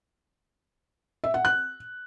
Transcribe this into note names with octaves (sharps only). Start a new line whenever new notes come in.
E5
F#5
F#6